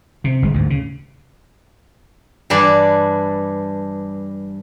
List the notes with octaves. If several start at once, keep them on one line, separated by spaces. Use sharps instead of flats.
C3
G1 G#3
D2 G#2
C#3
G2 E3 D4 D5